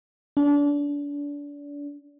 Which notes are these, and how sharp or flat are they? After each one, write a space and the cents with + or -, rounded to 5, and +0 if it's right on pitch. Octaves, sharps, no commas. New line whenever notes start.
D4 -30